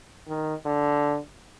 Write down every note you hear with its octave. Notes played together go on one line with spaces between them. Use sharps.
D#3
D3